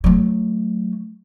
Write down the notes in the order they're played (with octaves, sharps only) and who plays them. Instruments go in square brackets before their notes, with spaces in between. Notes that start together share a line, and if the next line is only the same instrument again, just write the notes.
[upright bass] F#3 A3